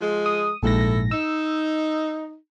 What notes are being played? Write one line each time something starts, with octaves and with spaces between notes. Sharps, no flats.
F3 G#3
D#6
A#1 G#2 E4 A4 A#6
D#4 E6